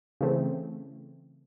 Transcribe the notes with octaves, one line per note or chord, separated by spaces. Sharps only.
C#3 E3 A3 C4